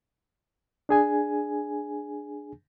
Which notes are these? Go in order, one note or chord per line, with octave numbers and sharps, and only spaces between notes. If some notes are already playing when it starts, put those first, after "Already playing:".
D4 G#4 G#5